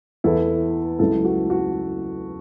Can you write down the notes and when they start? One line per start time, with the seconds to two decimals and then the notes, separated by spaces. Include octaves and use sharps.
0.24 E2 E3 E4 A4
0.99 C#2 C#3 F#3 E4 A4
1.25 F#4
1.50 F#4